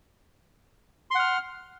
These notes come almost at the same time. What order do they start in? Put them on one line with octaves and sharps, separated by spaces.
C6 F#5 F6